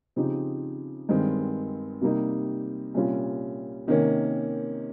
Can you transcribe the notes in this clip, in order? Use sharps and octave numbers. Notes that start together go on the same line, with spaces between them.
C#3 F3 C4 D#4 G4
G2 D#3 G#3 C4
C3 G3 A#3 D#4
C2 A#2 G3 C#4 F4
C3 D#3 A#3 C#4